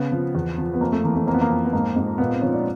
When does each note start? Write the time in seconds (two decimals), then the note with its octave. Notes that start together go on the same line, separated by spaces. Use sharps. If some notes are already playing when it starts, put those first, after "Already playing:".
Already playing: C#3 B3
0.12 F3
0.35 E2
0.58 F3
0.74 B3
0.81 F2 A#3
0.92 A3
1.04 E3 A#3
1.16 A3
1.27 F2 A#3
1.34 B3
1.41 A#3
1.50 F2
1.65 B3
1.73 G#2 A#3
1.96 G#2
2.18 A#2 B3
2.30 C4
2.42 F3 C#4
2.54 D4